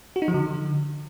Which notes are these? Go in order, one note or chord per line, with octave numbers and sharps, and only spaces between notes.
F#4
D#4
F3
D3